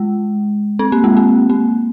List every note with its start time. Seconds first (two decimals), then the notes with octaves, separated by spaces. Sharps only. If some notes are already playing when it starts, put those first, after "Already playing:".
Already playing: G#3
0.79 C4
0.92 A#3
1.04 G#3
1.17 A#3
1.50 A#3